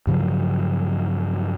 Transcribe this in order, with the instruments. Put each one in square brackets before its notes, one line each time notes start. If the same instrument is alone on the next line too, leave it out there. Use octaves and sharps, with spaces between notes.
[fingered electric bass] G2 C#3 F3 F#3